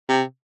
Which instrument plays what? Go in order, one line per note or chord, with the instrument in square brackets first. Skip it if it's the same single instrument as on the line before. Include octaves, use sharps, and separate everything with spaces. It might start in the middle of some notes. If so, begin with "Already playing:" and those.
[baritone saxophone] C3